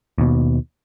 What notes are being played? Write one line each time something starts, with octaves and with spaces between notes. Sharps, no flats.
D#2 B2